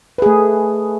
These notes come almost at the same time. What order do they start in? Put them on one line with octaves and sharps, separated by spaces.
B4 G#4 A3